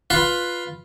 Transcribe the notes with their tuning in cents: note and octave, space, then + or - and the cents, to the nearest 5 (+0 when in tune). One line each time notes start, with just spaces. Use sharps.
F4 +5 B4 +0